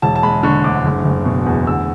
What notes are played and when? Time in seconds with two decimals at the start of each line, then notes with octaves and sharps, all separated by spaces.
0.02 E1 A5
0.16 A5
0.23 G#3 B5
0.43 D3 C#6
0.64 D2 D6
0.84 F#1
1.05 F#1
1.25 B2
1.46 E2
1.67 D2 E6